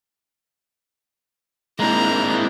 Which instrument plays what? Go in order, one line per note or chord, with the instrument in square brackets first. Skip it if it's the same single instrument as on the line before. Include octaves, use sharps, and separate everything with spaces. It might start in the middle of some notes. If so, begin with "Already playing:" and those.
[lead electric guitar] G#3 C4 [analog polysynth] A#3 D4 E4 [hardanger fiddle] A#5